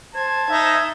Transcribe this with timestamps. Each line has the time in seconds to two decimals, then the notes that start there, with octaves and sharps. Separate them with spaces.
0.15 C5 A5 G#6
0.50 D#4 E5